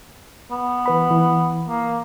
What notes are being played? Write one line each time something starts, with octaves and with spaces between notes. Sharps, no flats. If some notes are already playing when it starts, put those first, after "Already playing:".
B3
E3 B4 B5
E3
A#3